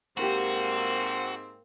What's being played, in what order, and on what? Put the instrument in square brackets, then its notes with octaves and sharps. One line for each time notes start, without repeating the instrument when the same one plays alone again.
[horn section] G#2 C4 [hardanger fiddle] A#3 [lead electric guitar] F#4 [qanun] G4 B5